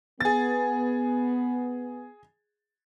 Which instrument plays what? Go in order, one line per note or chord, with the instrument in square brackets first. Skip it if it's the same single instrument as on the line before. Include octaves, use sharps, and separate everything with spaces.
[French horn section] B3 [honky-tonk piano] G#4 A6